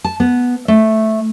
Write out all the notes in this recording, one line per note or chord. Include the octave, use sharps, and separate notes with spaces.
A5
B3
A3